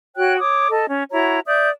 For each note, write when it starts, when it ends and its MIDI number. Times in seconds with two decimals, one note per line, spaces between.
0.16 0.37 66
0.16 0.37 73
0.16 0.37 79
0.16 0.37 90
0.38 0.68 73
0.38 0.68 86
0.38 0.68 87
0.69 0.85 69
0.69 0.85 75
0.89 1.04 61
1.12 1.39 64
1.12 1.39 66
1.12 1.39 73
1.12 1.39 82
1.46 1.70 74
1.46 1.70 76
1.46 1.70 87
1.46 1.70 91